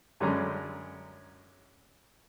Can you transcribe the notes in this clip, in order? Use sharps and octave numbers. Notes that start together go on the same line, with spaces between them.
F#2 D3 G3 G#3 C#4 A#5